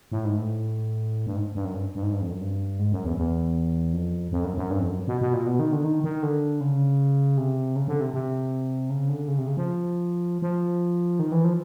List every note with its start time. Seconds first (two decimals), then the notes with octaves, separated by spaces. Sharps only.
0.12 A2
0.25 G#2
0.37 A2
1.27 G2
1.36 G#2
1.55 G2
1.65 F#2
1.74 G2
1.95 G2
2.03 G#2
2.12 G2
2.22 F2
2.32 F#2
2.41 G2
2.79 G#2
2.92 F#2
3.04 E2
3.17 E2
3.93 F2
4.32 F2
4.44 F#2
4.57 F#2
4.70 G2
4.79 F2
4.90 F#2
5.08 B2
5.21 B2
5.34 A#2
5.46 B2
5.59 D#3
5.72 D3
5.84 D#3
6.04 D#3
6.23 D3
6.61 C#3
7.37 C3
7.76 C#3
7.88 D3
8.01 C3
8.14 C3
8.90 C#3
9.09 D3
9.28 C#3
9.38 C3
9.48 C#3
9.57 F3
10.42 F3
11.19 D#3
11.32 E3
11.44 F3